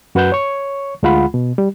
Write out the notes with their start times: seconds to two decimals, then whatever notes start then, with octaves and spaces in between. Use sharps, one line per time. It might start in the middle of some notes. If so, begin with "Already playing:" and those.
0.15 F#2 F#4 B4 F#5 F#6 G6
0.32 C#5 C#6
1.03 D2 G#3 F4 F#5 B5
1.34 B2
1.58 G3